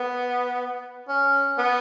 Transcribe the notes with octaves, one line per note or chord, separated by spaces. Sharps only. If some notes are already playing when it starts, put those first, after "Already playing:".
Already playing: B3
C#4
B3